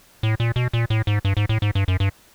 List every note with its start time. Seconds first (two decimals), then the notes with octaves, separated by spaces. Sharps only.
0.23 A2
0.40 A#2
0.56 B2
0.73 A#2
0.90 A2
1.07 G#2
1.25 G2
1.37 G#2
1.49 A2
1.62 G#2
1.75 G2
1.88 F#2
2.00 G2